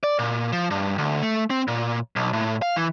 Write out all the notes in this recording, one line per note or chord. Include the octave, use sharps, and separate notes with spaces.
D5
A#2
F3
G2
D2
A3
C4
A#2
B1
A2
F5
E3